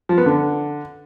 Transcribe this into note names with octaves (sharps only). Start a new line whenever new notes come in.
F3
B3
D3